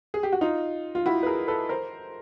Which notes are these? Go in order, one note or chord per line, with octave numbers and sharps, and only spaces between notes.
G#4
G4
F#4
D#4 F4
F4
E4 F#4
B4
G#4 A#4
A4 B4
A#4 C5